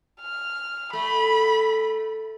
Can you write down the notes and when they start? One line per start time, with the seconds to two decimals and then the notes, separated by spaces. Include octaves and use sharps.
0.21 F6
0.93 A3 B5